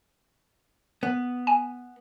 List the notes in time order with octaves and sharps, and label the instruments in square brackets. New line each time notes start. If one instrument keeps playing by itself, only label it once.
[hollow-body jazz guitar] B3
[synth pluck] G#5